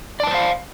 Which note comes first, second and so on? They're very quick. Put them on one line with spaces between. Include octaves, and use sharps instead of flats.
D5 A5 B4 C5 F5